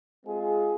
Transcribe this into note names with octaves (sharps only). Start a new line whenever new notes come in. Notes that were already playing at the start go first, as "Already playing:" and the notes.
G#3 C4 F4 G#4